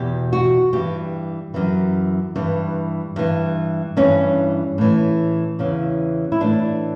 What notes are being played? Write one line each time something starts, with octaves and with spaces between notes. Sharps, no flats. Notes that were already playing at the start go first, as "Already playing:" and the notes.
Already playing: E2 B2 G4
F#4
G2 E3 G4
F#2 E3
G2 E3
G2 E3
G2 E3 C#4
A2 E3
E2 C#3 E3
E4
A2 E3 D4